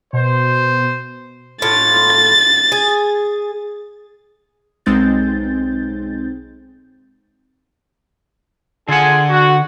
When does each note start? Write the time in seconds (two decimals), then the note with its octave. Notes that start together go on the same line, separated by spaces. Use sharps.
0.13 B2 C5
1.62 A2 F4 A6
2.72 G#4
4.86 B1 G#3 C4 D#4 G6 A6
8.88 D3 F4 G#4 F#5 G#5
9.29 F#4